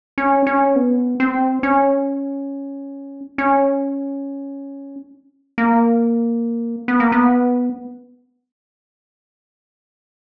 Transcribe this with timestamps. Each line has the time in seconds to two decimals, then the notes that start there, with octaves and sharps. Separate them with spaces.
0.18 C#4
0.47 C#4
0.76 B3
1.20 C4
1.63 C#4
3.38 C#4
5.58 A#3
6.88 B3
7.00 A#3
7.12 B3